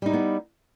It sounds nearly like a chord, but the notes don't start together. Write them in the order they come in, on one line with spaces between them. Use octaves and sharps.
G3 D#4 E4 B3